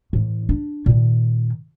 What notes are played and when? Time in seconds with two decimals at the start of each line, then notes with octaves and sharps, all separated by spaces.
0.13 A2 E3
0.49 D4
0.86 A#2 D#3